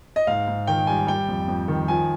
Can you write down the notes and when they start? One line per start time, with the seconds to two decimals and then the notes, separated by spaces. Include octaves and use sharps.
0.16 D#5
0.27 G#2 F5
0.48 G#2
0.67 D#3 G5
0.87 G3 G#5
1.07 G3 G5
1.28 F2
1.48 F2
1.68 D#3
1.88 F3 G#5